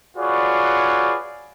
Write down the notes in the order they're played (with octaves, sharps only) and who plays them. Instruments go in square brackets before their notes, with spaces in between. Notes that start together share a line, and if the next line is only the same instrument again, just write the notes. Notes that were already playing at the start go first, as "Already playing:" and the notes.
[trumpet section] F4 F#4 G#4 B4 C#5 D5